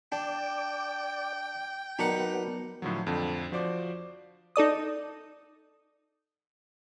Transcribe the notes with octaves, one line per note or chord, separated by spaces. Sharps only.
D4 D5 G5 A5
F#3 B3 D#4 A#4 B4 D5 F#5 A5
A2 D3 F3 F#3
F2 D3
F3 F#4 C5 D5 D6
D#4 A4 D5 D#6